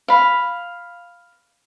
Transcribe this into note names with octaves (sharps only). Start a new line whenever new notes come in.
F5 B5